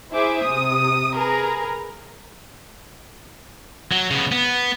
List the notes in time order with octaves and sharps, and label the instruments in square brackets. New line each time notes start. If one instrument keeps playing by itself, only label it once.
[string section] E4 G#4 C5 E5 D6
C3 D#6
G#4 A#4 B4 A#5
[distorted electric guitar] F#3
C#3 B3
B3